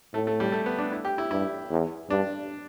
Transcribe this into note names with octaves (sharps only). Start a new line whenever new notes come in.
A2 A3
A3
G3
A3
B3
D4
E4
G4
E4
G2 E4
E2
G2 D4